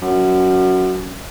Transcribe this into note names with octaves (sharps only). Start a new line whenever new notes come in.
F#2